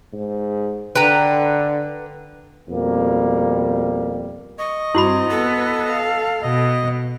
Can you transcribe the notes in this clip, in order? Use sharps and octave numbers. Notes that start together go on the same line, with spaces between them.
G#2
D3 B4 G5 A#5
F2 B2 G3 A#3
D#5 C#6
G2 C4 E4 F#4 B5
B3 A4 B4
F5
B2 D#5